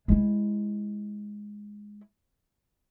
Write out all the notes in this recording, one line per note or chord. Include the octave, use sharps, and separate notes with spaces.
G#3 E4